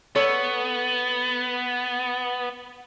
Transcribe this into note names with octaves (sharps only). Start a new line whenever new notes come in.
B3 A4 C#5